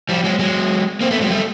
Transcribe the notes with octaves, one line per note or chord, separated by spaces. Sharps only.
F3 G3
F#3 G#3
F#3 G#3
A#3 C4
A3 B3
F#3 G#3
G3 A3